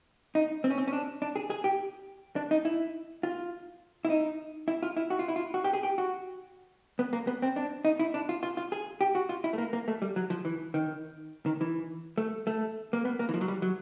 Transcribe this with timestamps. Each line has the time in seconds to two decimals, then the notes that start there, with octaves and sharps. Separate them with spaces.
0.35 D#4
0.64 C4
0.70 C#4
0.78 C4
0.88 C#4
0.93 D4
1.22 D4
1.36 G#4
1.50 G#4
1.64 G4
2.36 D4
2.51 D#4
2.65 E4
3.23 F4
4.05 E4
4.10 D#4
4.68 E4
4.83 F4
4.97 E4
5.10 F#4
5.19 F4
5.28 E4
5.36 F4
5.54 F#4
5.64 G4
5.73 G#4
5.83 G4
5.98 F#4
6.99 B3
7.13 A#3
7.27 B3
7.42 C4
7.56 D4
7.85 D#4
7.99 E4
8.14 D4
8.29 F4
8.43 F4
8.57 F4
8.72 G#4
9.01 G4
9.15 F#4
9.29 F4
9.44 E4
9.53 A3
9.58 A#3
9.73 A#3
9.88 A3
10.02 G3
10.16 F#3
10.30 F3
10.45 E3
10.74 D#3
11.46 D#3
11.61 E3
12.18 A3
12.47 A3
12.93 A#3
13.05 B3
13.19 A#3
13.29 E3
13.34 F3
13.41 F#3
13.48 G3
13.62 F#3